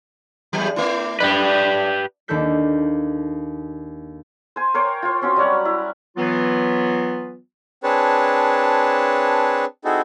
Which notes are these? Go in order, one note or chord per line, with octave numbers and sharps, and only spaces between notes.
E2 A2 F#3
A3 E4
F#2 A2 G4 B4 D5
D#2 D#3 D4 A4 G6 B6
C5 G#5
A#4 C5 C#5 G5
F4 C5
C4 C#4 F#4
F#3 G3 C#5 F#5
E4
E3 F#3 B3 F4
C4 D4 G#4 B4 C#5 A5
C4 D#4 E4 F#4 G#4 A4